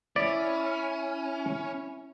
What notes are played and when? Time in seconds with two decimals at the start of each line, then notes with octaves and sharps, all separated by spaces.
0.16 C#4 E4 D5